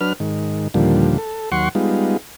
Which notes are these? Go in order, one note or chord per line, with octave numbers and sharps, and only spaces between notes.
F#3 D4 B4 F6
G#2 D#3
D#2 A#2 D3 F3 G3
A4
D#2 F#3 F#5 C6 C#6
G3 G#3 B3 D#4 F4